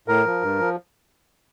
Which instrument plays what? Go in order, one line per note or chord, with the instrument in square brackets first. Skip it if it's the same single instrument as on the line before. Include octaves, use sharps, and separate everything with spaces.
[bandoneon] A2 A#4
F3
G2
F3